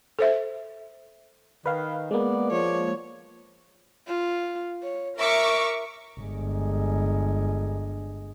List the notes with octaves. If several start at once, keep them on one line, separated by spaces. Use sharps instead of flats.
A4 C5 E5
D#3 B4 F5
G#3 A#3 B3 D5
F3 C#5
F4
C#5
A#4 E5 C#6 D6
G1 G#3